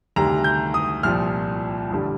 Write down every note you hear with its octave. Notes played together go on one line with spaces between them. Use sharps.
D2 C3 D#3 G3 A#5
G6
D#6
C2 A#2 F3 F6
A1 G2 D3 G3